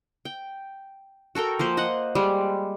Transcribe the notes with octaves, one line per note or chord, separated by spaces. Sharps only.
G5
F#4 A4 A#4 G5
F3 A#3 C5
D#5 F#5
G3 G#3